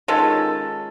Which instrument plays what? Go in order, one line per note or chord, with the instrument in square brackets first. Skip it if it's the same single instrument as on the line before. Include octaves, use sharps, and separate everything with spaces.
[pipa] D#3 G#3 C#4 F4 A4